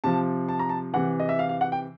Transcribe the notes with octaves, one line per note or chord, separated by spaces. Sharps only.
C3 F3 A5
A5
A#5
A5
C3 E3 F#5
D#5
E5
F5
F5
F#5
G5